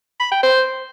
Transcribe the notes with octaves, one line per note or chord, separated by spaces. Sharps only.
B5
G5
C5